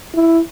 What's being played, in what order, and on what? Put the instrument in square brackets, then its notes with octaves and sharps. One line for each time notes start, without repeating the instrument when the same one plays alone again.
[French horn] E4